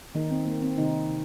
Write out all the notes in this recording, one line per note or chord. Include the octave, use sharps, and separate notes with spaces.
D#3 A#3 D#4
C4
A#3
C4
C3 D#3 D#4
C3